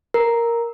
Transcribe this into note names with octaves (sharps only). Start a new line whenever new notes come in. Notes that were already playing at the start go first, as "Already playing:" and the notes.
A#4